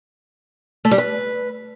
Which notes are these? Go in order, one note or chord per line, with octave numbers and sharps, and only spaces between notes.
A3
G3
B4